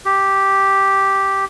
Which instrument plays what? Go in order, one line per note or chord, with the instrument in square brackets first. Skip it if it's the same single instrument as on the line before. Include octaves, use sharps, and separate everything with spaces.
[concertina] G4